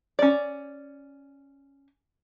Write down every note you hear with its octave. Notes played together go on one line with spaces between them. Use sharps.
C#4 D5